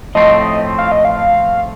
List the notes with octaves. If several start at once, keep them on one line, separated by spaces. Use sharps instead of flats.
A2 F3 A3 C4 D#5
F5
D#5
F5